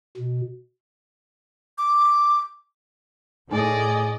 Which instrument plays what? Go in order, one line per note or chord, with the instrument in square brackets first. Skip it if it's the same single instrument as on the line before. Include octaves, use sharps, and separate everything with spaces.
[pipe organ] B2
[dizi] D6
[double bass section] A2 [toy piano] D#4 G#5 [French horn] G#4 [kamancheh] D5 D#5